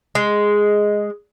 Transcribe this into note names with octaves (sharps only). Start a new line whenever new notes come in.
G#3